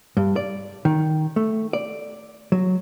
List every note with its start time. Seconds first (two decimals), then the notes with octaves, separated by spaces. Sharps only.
0.17 G2
0.36 D5
0.85 D#3
1.36 A3
1.73 D5
2.52 F#3